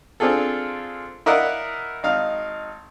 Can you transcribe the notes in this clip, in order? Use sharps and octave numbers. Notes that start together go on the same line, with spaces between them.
C4 D4 F4 G#4 A4
E4 A#4 D5 D#5 F5 F#5
G#1 D#4 F5